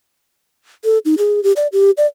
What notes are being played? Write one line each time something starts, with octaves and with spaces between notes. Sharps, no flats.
A4
D#4
G#4
G4
D5
G4
D5